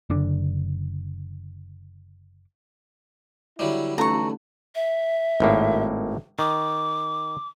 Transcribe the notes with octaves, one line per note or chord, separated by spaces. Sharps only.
F#1 D3 D4
D3 F#3 G3 E4
E3 A3 C#4 D#4 A4 A#5 C#6
E5
G#1 A2 A#3
D#3 D6